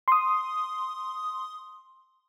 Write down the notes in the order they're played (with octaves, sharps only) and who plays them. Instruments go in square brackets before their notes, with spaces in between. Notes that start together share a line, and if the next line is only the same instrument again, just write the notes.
[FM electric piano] C6 D#6